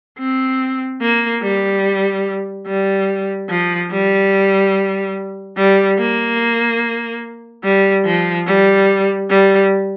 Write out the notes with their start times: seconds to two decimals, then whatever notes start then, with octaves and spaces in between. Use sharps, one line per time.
0.19 C4
1.01 A#3
1.43 G3
2.67 G3
3.50 F3
3.91 G3
5.57 G3
5.98 A#3
7.64 G3
8.05 F3
8.46 G3
9.30 G3